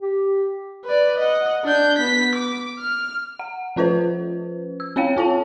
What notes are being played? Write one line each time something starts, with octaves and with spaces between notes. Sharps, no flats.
G4
B4 D5
D#5 F#5
D4 G6
B3 B6
D6
F6
F#5
F3 C#4 F4 B4 C5
E6
C4 C#4 C#5 F5 G5
C4 F4 C#5 A5